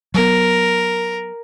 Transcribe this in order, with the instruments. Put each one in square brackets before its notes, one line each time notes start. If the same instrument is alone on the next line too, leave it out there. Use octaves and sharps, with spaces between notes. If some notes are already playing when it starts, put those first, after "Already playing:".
[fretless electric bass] F#3 B3 [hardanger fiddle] A#4